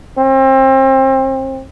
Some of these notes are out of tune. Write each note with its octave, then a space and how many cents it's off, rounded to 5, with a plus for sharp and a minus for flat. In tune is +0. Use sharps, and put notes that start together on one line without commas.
C4 +30